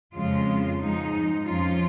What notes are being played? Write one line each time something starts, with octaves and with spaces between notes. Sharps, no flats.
F2 C#3 G#3 F4
G#2 F3 G#3 D#4
F2 F3 C#4 F4